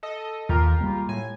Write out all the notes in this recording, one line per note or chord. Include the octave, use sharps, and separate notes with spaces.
A4 D#5
D#2 F4 G4 A#4
G3 G#3 A#3
A2 G#5